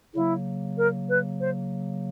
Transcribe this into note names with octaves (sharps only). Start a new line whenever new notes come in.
C#3 F#3 A#3 E4
A#4
B4
C5